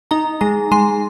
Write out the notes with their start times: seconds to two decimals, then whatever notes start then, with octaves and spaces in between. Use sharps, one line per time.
0.11 D#4 A#5
0.41 G#3 A#5
0.72 G#3 C6